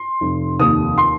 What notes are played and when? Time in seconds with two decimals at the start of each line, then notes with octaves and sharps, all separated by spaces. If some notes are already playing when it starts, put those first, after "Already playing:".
Already playing: C6
0.21 F1
0.60 D#2 D#6
0.98 C6